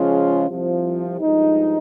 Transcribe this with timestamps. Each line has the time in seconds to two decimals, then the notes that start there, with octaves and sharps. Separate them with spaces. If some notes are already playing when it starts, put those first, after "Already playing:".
Already playing: C#3 F3 G#3 C#4 F4
0.48 C2 C3 F3 C4
1.20 G2 F3 G#3 D#4